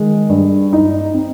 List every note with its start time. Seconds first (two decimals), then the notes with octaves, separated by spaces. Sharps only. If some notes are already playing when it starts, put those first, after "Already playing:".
Already playing: D#3 G#3
0.29 G2
0.73 D#4
1.14 C4